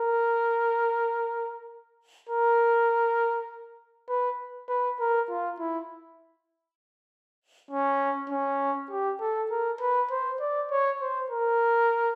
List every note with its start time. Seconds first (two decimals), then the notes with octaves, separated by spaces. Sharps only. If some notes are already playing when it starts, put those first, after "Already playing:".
Already playing: A#4
2.29 A#4
4.09 B4
4.69 B4
5.00 A#4
5.29 F4
5.59 E4
7.71 C#4
8.30 C#4
8.91 G4
9.20 A4
9.51 A#4
9.81 B4
10.11 C5
10.40 D5
10.71 C#5
11.02 C5
11.31 A#4